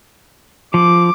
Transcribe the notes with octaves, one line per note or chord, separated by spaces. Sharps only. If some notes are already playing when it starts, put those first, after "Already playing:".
F3 D6